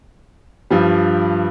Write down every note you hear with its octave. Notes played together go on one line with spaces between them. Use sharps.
G2 F3 G3